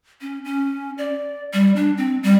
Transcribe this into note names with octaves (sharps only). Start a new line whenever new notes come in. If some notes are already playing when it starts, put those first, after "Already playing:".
C#4
C#4
D5
G3
D4
C4
G3